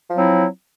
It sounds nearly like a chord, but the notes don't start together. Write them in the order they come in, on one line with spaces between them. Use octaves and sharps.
F3 F#3 C4 E4